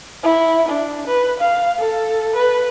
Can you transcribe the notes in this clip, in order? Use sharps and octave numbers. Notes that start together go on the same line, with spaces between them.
E4
D4
B4
F5
A4
B4